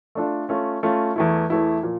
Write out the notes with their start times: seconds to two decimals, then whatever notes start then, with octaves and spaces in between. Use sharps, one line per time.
0.15 A3 D4 F4 A4
0.49 A3 C#4 F4
0.83 A3 C#4 F4
1.16 E2 E3 A3 E4
1.50 E2 E3 A3 E4
1.83 A#2 F3